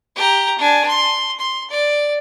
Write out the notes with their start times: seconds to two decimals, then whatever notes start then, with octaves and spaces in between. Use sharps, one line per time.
0.16 G4 A#5
0.59 D4 G#5
0.89 C6
1.39 C6
1.71 D5